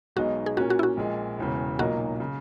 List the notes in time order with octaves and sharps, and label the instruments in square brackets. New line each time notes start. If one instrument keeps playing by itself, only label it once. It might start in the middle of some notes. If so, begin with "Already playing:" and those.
[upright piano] B1 B2 G#3 D#4 [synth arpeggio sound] F#4
[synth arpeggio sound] G#4
[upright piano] A#2 A#3 C#4 [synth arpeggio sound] F#4
[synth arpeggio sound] F#4
E4
F#4
[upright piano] A#1 A#2 G#3
E1 E2 C#3
[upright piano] B1 A#2 F#3 A#3 D#4 [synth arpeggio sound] F#4
[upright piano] C#3